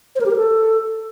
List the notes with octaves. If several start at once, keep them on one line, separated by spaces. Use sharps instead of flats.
C5
A#4
G4
A#4
A4